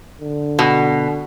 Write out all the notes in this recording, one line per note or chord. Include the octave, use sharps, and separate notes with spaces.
D3
B2